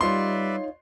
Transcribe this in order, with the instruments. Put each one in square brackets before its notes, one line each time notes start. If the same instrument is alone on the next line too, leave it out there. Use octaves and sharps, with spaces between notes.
[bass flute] G3 [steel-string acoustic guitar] D#4 F4 C#5 [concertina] B4 D5 E5 [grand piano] C6